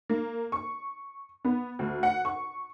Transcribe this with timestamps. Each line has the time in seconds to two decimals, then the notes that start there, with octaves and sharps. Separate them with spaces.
0.09 A#3
0.52 C#6
1.45 B3
1.79 D2
2.03 F#5
2.25 C#6